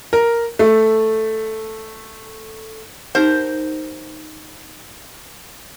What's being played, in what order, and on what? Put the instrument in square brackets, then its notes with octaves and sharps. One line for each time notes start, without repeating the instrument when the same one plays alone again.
[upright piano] A#4
A3
[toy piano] D#4 G4 F#5 [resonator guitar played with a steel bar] A#4 C5